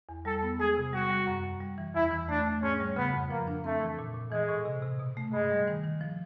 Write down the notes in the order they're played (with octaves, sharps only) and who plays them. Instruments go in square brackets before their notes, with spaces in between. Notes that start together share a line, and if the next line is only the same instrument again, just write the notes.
[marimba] E2
[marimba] G3 [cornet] A4
[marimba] B3
[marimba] G#3 [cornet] G#4
[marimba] C3
[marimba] G3 [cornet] F#4
[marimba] G3
F#2
F#2
G3
E3
[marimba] E2 [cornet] E4
[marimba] E3
[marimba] A3 [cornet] D4
[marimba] A3
[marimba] G#2 [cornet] C#4
[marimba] G3
[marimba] C#3 [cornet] B3
[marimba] F2
[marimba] F3 [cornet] A#3
[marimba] D4
[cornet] A3 [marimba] C4
[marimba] E3
A#2
A#2
[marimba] E3 [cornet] G#3
[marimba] A2
C3
C3
B2
A3
[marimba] G2 [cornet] G#3
[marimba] G3
D#3
D#3
F3